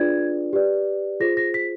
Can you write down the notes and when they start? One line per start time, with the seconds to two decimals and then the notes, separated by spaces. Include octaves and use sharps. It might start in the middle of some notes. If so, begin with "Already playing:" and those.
Already playing: D4 F4 G#4 B4 D5 G#6
0.53 G4 B4 D5
1.20 F4 G#4 C5 A#6
1.37 A#6
1.54 B6